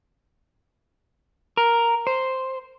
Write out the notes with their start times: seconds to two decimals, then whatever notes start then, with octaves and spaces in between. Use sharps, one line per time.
1.57 A#4
2.07 C5